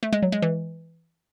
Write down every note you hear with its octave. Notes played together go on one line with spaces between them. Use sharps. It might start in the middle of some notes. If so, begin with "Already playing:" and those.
A3
G#3
F#3
G#3
E3